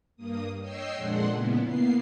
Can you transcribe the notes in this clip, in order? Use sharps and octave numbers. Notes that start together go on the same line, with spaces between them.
G2 A#3 D#6
C#5 D#5 G5 E6 C7
F2 A#2 G#3 D4 F#5 C6
A#2 C#3 B3 E4
A#3 B3 C7